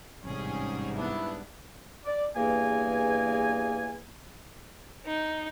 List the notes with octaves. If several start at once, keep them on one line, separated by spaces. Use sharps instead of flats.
A1 G#2 C3 G3 C#4 G#4
B3 D4 E4
D5
E2 G2 A#3 G#4 G#5
D#4